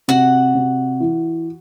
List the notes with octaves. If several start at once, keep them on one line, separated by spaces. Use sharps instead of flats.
C3 F#4 F#5
C3
E3